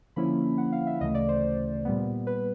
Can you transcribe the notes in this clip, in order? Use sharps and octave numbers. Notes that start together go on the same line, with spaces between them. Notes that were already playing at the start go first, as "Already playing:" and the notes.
D3 F3 A#3 C#4 E4 B5
F#5
F5
E5
D2 C#3 E3 A3 D#5
D5
C5
A#2 G3 B3
B4